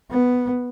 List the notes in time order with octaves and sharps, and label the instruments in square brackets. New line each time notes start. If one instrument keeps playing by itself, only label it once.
[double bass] B3